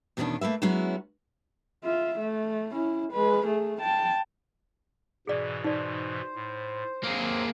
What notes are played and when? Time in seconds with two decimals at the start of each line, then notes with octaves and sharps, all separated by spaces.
0.17 E2 B2 D#3 B3 C#4 D4
0.41 A3 A#3 B4 E5
0.62 F#3 G#3 B3 C#4 E4 F#4
1.84 F4 E5
2.19 A3
2.73 C#4 E4
3.13 G#3 B4
3.46 A3 G#4
3.81 G5 A5
5.27 G#2 B2 E3 G#4 D5
5.64 D#4 C5 D5
6.35 A2
7.04 F#3 A#3 C4 G#4